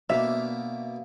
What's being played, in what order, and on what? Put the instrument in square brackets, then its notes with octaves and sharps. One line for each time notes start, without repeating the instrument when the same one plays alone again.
[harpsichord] B2 A#3 [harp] D4 F5 [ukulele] E5